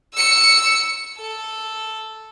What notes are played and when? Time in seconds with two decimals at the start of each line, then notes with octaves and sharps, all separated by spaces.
0.14 E6 C#7
1.18 A4